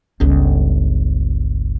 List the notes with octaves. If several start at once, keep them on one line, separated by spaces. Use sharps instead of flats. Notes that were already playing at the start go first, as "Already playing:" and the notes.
G1 C#2